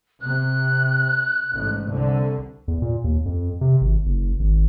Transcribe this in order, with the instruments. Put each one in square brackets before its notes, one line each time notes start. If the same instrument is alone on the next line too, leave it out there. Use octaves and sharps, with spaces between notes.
[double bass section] C3 [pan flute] F#6
[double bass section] A1 G#2
C2 D3
[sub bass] E2
A#2
D#2
F2
C3
G#1
F#1
G#1